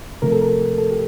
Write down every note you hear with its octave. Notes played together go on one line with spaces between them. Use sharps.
C3 F3 A3 A#4
A4
A#4
A4
G4